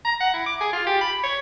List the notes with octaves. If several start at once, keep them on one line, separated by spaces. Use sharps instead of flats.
A#5
F#5
E4
D6
G#4
F4
G4
B5
C#5